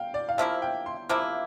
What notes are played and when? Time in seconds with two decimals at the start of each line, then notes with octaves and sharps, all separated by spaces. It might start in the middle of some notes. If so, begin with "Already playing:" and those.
Already playing: F5 G5
0.14 D5
0.29 F5
0.38 C3 F3 A#3 E4 E5
0.62 G5
0.86 C6
1.09 C3 F3 A#3 E4 D6